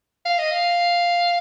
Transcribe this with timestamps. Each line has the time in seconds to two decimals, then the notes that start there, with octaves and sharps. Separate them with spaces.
0.25 F5
0.38 D#5
0.51 F5